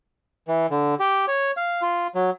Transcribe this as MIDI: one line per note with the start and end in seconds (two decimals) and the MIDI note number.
0.48 0.66 52
0.70 0.95 50
1.00 1.25 67
1.28 1.51 73
1.57 1.82 77
1.82 2.07 65
2.15 2.30 54